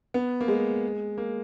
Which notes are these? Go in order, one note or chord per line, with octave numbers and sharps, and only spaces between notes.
B3
A#3
G#3
A#3